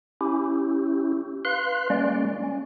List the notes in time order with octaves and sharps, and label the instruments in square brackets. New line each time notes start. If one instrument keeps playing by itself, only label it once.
[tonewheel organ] C#4 E4 G4
B4 F5 C6 F#6
G3 G#3 A#3 C#4 D5
C#4